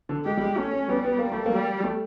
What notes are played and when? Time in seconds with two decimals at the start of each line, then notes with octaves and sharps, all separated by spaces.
0.09 D3
0.25 G#3 G4
0.37 G3
0.41 G#3
0.57 A3 C#4
0.73 A3
0.89 G3 B3
1.05 B3
1.19 A#3
1.32 A3
1.46 A#3
1.52 G3
1.84 A3